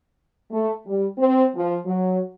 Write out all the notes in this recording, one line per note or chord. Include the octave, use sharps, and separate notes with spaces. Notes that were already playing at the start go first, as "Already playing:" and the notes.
A3
G3
C4
F3
F#3